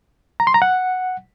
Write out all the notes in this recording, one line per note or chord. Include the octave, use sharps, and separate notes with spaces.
A#5
C6
A#5
F#5